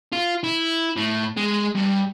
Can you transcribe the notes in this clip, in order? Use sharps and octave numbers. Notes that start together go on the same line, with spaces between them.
F4
E4
A2
G#3
G2